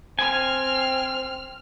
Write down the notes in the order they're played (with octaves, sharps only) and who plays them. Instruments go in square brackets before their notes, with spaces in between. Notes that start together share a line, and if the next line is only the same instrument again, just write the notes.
[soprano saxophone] C4 [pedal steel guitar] G#5 [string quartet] F6